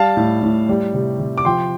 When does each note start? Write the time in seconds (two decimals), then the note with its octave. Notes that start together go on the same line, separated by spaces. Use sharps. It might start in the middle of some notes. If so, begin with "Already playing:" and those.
Already playing: G3 F5 A5
0.17 A2
0.43 A2
0.69 G3
0.94 C3
1.19 C3
1.38 D6
1.45 F3 G5 C6